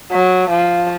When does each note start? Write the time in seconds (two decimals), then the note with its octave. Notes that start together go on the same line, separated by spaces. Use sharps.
0.12 F#3
0.50 F3